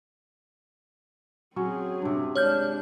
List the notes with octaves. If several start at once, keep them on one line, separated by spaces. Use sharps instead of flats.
F#3 C4 C#4 G#4
G2 C3
G#3 D4 C#5 F6 G6